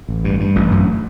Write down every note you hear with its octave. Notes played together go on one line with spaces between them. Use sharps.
A1
G2
G2
A1
F#2